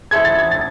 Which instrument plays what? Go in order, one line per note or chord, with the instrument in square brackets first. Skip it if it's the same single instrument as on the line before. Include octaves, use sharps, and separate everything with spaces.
[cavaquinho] E4 A4 C5 [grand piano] G#6
[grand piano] A6
G#6
A6